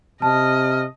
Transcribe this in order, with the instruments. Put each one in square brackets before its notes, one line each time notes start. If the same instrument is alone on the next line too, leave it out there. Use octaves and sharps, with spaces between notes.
[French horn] C3 [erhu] D#5 [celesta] A5 [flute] F6